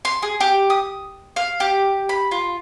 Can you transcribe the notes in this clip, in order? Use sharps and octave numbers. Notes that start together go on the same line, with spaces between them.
C6
G#4
G4
D#6
F5
G4
B5
F4